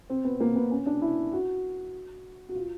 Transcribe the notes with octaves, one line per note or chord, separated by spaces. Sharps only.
C4
B3
A#3
B3
C#4
D4
E4
F#4
F#4
F4